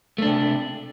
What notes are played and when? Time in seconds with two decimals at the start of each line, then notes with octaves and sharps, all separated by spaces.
0.18 A3
0.22 D4
0.26 C3